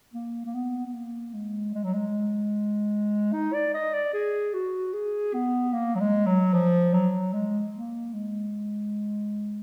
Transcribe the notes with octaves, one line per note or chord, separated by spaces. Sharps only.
A#3
A#3
B3
B3
A#3
G#3
G#3
F#3
G#3
D#4
D5
D#5
D5
G#4
F#4
G#4
B3
A#3
F#3
G#3
F#3
F3
F#3
G#3
A#3
G#3